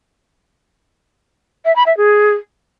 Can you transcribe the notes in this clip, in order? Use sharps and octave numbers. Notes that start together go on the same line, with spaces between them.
E5
B5
E5
G#4